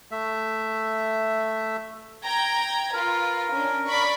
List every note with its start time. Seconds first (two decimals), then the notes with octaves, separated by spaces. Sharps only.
0.11 A3 E5
2.24 G5 A#5 G#6
2.94 F4 A#4 B4
3.51 C#4 D4
3.86 D5 B5 C#6